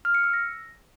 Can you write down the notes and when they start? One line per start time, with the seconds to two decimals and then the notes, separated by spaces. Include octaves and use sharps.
0.05 F6
0.14 C#7
0.24 E6
0.34 A#6